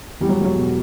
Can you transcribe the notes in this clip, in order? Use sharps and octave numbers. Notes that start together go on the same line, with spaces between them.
E2 G3
F#3
E1 F#3
B2